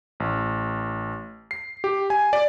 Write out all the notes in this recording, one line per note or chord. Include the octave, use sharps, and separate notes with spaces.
A1
C7
G4
G#5
D5